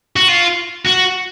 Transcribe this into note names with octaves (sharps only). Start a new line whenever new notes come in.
F#4
F4
F#4